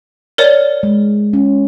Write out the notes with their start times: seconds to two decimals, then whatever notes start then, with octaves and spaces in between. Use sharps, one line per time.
0.38 A#4 C#5 D5
0.83 G#3
1.33 C#4